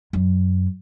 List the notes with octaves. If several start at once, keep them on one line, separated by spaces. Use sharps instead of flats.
F#2